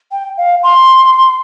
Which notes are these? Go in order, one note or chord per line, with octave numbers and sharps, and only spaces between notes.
G5
F5
C6